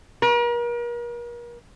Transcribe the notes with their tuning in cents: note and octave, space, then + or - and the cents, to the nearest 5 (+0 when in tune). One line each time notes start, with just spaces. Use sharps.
A#4 +40